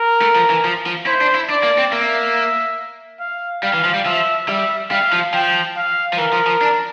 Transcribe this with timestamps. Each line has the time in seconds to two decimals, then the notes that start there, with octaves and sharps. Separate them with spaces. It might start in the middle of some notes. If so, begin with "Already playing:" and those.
Already playing: A#4
0.22 A3
0.35 F3
0.50 E3
0.65 F3
0.86 F3
1.06 E4 C5
1.21 D4
1.35 E4
1.49 D4 D5
1.63 A#3
1.78 C4
1.92 A#3 E5
3.20 F5
3.63 G3 F5
3.74 E3
3.85 F3
3.94 G3
4.05 F3 E5
4.48 G3 E5
4.91 G3 F5
5.13 F3
5.33 F3 G5
5.76 F5
6.13 F3
6.18 E3 A#4
6.33 F3
6.47 F3
6.61 D4